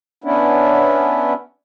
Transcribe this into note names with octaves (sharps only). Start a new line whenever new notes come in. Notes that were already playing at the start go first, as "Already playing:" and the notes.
B3 C#4 D4 E4